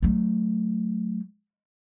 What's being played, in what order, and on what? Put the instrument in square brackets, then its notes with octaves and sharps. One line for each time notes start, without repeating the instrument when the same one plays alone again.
[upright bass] F#3 A3